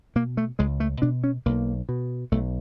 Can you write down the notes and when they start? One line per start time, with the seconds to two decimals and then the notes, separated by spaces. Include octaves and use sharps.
0.16 B2 A#3
0.37 A3
0.59 C#2 G#3
0.80 A3
1.02 B2 D4
1.24 C#4
1.46 B1 A#3
1.89 B2
2.32 B1 A3